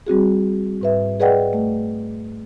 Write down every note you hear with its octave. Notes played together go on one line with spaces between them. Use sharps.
G3 C4 F#4 G#4
G#2 B4 E5
G#4 B4 D5 D#5 F#5 G5
A3